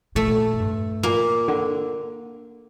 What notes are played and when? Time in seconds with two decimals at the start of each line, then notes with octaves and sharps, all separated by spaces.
0.15 A#2 A3
0.53 F2
0.60 G2
1.03 A#2 A#3
1.48 D3